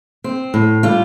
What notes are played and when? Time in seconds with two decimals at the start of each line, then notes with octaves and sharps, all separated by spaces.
0.24 C4
0.54 A2
0.83 G3 F4